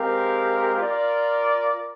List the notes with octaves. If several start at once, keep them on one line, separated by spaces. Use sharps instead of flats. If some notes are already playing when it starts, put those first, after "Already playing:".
Already playing: G#3 C4 G4 A#4 F5
F4 A#4 D5